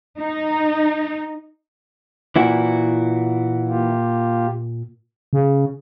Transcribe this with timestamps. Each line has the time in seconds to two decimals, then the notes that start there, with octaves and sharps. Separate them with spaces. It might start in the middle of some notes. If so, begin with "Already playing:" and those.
0.20 D#4
2.36 A#2 E3 E4 F#4
3.68 A#3 F4 G4
5.33 C#3